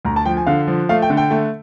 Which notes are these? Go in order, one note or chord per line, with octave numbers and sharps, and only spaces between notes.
D2 A#5
A5
F3 G5
G#5
D3 F5
F3
A3 F5
G5
D3
G5
A3